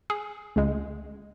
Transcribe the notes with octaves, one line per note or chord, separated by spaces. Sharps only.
G#4
C#2 C#3 G#3